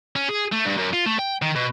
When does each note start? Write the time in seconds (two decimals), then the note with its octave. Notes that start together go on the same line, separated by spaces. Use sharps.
0.16 C#4
0.29 G#4
0.52 A3
0.65 G2
0.78 F#2
0.93 F4
1.06 A3
1.19 G5
1.42 D#3
1.55 B2